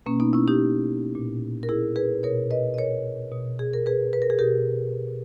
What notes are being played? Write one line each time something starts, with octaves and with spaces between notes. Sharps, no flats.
B2 A#3 C#4
B3 D#4
C#4 E4
D#4 G4
A#2
A#4
E4 G#4
G#4 B4
B2 A#4 C#5
B4 D#5
D#5
A#4 C#5
B2
G#4
A#4
G#4 B4
B4
A#4
G#4
B2 G4 A#4